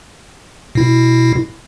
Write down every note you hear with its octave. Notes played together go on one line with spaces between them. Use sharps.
B2 E4